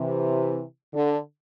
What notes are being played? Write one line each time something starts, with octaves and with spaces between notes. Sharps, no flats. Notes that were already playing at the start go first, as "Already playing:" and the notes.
Already playing: C3 E3
D3